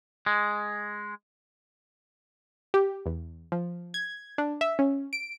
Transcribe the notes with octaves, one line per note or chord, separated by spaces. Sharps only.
G#3
G4
E2
F3
G#6
D4
E5
C#4
D7